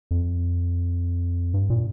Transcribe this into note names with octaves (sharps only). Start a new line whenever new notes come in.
F2
G2
A#2